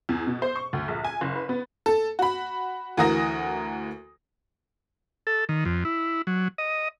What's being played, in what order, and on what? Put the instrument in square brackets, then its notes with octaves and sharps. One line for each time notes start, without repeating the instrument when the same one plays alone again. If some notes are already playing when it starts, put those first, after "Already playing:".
[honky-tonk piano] E2
B2
C5
C#6
D2
A#1
G#5
F#1
B4
B3
A4
F#4 B5
D2 E3 F#4 A#4 D#6 A#6
[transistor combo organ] A4
D#3
F2
E4
F#3
D#5